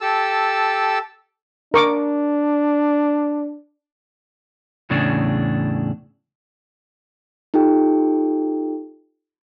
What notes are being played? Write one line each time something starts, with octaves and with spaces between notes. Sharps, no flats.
G4 A4 A5 E6
D4 A#4 C#6 D6
E2 A2 C#3 D4
D#4 F4 G4 A4 G5